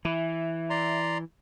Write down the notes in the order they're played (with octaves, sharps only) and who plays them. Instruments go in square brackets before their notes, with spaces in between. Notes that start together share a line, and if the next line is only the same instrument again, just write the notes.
[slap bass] E3 [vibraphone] E5
[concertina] D5 A#5 C6